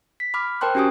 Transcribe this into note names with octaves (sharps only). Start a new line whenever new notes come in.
B6
B5 D6 F6
A#4 C5 G5 A5 C6 F#6
C#4 F#4 G4 G#5 D#6